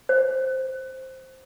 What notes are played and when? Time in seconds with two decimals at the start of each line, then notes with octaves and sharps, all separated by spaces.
0.09 C5